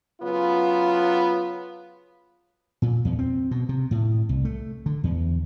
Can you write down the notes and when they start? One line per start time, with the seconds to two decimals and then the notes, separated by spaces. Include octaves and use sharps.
0.21 C#3 F#3 B3 F4
2.82 A#2
3.05 E2
3.19 C4
3.51 B2
3.69 C3
3.91 A2
4.29 C2
4.45 A3
4.86 D3
5.04 E2